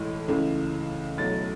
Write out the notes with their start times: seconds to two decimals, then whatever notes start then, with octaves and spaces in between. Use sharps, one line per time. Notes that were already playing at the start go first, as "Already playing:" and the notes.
Already playing: B1 A2 E3 G#3
0.28 C#2 C#3 E3 A3
1.18 B1 A2 F#3 A3 A6